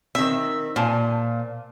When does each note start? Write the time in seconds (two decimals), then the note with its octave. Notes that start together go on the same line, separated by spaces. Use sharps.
0.15 D#3 C4 E5
0.76 A#2 C5 G#5 A5